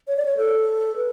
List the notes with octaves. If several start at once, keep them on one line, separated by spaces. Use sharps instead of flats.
C#5
D5
C#5
A4
B4